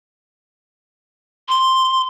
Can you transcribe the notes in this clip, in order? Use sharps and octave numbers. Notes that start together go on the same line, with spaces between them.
C6